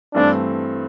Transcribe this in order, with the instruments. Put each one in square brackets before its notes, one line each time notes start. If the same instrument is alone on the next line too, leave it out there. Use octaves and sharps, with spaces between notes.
[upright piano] G2 E3 A3 C4 [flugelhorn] D4